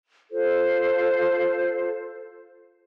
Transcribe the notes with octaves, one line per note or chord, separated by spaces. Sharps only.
F4 A4 C5